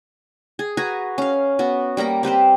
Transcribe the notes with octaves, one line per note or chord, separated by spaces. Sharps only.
G#4
F#4 B4 G#5 A#5
C#4 F5
B3 F#4
G3 A#3 A#4 A#5
C4 G4 B4 C5